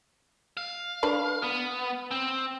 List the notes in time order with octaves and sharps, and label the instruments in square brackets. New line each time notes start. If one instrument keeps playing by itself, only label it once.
[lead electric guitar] F5
[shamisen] D4 B4
[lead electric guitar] B3
C4